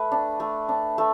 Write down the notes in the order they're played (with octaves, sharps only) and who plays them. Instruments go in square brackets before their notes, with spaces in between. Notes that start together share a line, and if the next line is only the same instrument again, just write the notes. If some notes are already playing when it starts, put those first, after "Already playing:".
Already playing: [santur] A3 B4
D4
A3
D4
A3